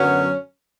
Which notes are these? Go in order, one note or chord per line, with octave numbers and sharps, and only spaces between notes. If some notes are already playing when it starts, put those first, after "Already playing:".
Already playing: F#2 D3 F#3 B3 C#4